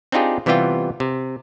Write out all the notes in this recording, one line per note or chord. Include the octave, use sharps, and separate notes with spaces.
C4 D4 D#4 F4 G4 G#4
C3 E3 G3 B3 F4 G5
C3